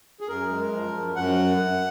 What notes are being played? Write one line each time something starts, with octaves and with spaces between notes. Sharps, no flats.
G#4
F#2 A#4
G#3
F3
F#2
F#2 F#5